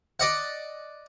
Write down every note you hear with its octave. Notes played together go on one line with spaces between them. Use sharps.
D5 D#5 F#5